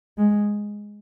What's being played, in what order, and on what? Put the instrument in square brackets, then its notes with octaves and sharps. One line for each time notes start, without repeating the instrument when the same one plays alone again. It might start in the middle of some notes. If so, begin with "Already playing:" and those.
[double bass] G#3